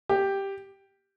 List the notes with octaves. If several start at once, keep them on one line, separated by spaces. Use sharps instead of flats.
G4